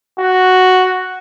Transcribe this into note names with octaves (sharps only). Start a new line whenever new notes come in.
F#4